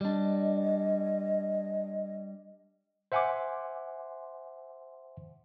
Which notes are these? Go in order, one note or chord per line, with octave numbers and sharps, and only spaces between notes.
G3 D4 D#5
C5 E5 F#5 G#5 C6 D6